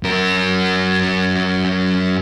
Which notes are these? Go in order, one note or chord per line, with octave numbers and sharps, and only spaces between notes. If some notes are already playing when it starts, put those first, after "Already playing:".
F#2 A#4